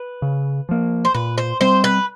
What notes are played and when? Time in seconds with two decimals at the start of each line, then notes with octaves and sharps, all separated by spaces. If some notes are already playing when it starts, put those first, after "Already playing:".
Already playing: B4
0.22 C#3
0.69 F3 A#3
1.05 C5
1.15 A#2 B4
1.38 C5
1.61 G3 C4 C5
1.84 B4